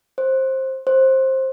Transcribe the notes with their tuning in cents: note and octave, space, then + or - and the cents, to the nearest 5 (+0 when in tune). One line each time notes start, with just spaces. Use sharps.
C5 +15
C5 +15